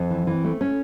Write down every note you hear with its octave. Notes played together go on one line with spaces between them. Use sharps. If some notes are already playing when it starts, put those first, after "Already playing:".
Already playing: F2 C4
E3
E3
A3
C#4